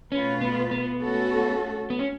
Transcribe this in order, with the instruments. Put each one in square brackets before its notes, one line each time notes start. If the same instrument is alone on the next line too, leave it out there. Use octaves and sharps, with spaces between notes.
[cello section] B2 A3 F4 B4 [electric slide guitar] C#4
[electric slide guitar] B3
B3
[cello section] A3 C#4 F#4 A4
[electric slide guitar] B3
C#4